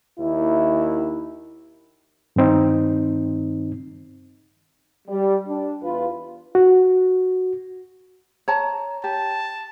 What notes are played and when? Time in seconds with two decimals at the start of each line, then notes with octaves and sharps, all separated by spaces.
0.20 D#2 D#3 E4
2.36 G2 D#3 C4 D#4
5.08 G3
5.47 D4
5.83 E2 F4 B4
6.55 F#4
8.48 C#5 A5 A#5
9.04 G4 A5